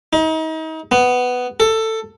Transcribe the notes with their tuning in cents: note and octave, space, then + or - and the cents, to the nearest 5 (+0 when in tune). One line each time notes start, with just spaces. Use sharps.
D#4 +35
B3 +10
A4 +15